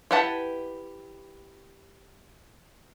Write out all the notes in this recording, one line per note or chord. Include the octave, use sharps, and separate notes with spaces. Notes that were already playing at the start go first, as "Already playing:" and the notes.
E4 G4 B4 F#5 A5